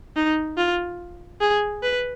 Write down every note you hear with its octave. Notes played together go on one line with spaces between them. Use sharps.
D#4
F4
G#4
B4